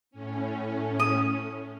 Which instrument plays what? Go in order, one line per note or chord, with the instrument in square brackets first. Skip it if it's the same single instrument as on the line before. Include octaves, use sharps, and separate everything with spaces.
[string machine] A2 C#4
[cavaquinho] D#6